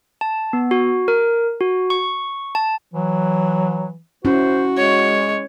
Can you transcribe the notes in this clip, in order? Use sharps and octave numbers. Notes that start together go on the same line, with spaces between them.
A5
B3
F#4
A#4
F#4
C#6
A5
E3 F#3
C#4 E4 F#4 C5
G#3 C#5